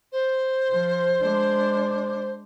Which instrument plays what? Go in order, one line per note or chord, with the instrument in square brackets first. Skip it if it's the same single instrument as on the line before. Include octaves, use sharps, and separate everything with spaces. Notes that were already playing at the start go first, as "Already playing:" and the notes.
[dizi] C5
[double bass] F3
G#3 D4